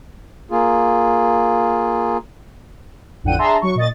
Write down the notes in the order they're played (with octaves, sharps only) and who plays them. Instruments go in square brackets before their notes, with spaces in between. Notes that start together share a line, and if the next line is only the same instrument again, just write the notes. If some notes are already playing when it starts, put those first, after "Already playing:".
[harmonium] A#3 F4 G#4
[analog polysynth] A1 F2 D3 F#5 G5 D#7
D4 G#4 E5 A5 A#5 C6
F#3 C#6
A#2 D#5 A6